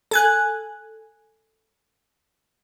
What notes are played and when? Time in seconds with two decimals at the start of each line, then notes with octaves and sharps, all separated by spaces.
0.11 A4 G#5 F#6